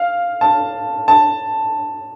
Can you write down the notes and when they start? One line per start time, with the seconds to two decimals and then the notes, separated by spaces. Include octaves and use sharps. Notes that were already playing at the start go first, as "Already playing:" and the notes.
Already playing: F5
0.41 A5
1.08 A5